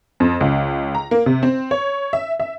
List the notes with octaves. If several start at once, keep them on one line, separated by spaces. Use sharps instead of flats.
F2
C#2
A#5
A#3
C3
C4
C#5
E5
E5